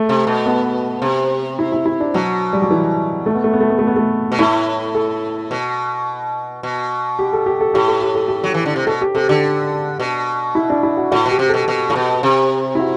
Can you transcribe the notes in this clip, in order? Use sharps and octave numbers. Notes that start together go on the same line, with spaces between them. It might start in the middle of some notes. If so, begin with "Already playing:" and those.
Already playing: A3
C3
B2
B3
C3
E4
E4
E4
D4
B2 F#3
G3
F#3
E3
A3
B3
A3
B3
A3
B3
A3
B3
A3
B2
A2 E4
A4
B2
B2
G4
A4
G4
A4
A2 G4
A4
G4
A4
G4
F#3
E3
D3
C3
B2 A4
G4
C3 A4
D3 G4
B2
E4
D4
E4
F#4
A2 F#4
B2
G4
C3
B2 A4
B2
A2
B2
C3
E4
F#4